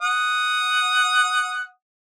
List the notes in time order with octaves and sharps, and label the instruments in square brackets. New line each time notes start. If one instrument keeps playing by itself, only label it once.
[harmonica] F#5 D#6